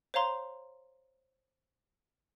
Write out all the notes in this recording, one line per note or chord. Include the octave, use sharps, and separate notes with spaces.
C5 C#5 F5 A#5 C6